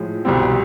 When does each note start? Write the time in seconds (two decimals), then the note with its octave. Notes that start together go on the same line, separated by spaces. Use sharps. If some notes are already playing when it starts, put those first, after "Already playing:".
Already playing: A2 F3 G#3
0.25 C2 B2 G3 C4